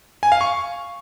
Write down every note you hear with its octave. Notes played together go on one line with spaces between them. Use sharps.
G#5
F5
C#6